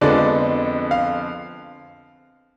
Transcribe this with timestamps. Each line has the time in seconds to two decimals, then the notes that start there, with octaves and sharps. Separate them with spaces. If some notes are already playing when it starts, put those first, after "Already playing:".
0.01 F2 D3 F3 G#3 B3 D5
0.91 F5